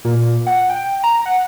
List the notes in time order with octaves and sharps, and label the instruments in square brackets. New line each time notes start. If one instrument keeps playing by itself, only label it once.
[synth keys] A#2
F#5
G5
A#5
F#5